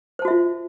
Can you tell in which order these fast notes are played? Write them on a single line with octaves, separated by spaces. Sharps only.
C5 A5 F#4 E5 F4